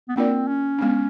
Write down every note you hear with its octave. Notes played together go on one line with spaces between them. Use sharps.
B3
A#3 C4 D4 F4 A#4 D5
C#4
G#3 B3 D4